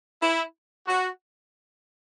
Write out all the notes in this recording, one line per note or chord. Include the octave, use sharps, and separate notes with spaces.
E4
F#4